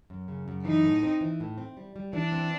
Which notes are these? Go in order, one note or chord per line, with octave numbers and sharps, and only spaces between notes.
F#2
C#3
F#2
E3 D#4
A2
C4
E3
A2
C4
G3
G3
E3 D4
C4